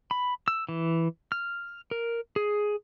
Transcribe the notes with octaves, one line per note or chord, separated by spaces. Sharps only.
B5
E6
E3
F6
A#4
G#4